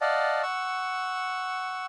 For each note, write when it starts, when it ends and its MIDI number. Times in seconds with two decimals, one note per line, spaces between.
0.01 0.42 74
0.01 0.42 75
0.01 0.42 77
0.01 0.42 78
0.01 0.42 81
0.43 1.86 78
0.43 1.86 85
0.43 1.86 88